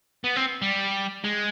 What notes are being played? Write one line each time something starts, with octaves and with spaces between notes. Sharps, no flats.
B3
C4
G3
G#3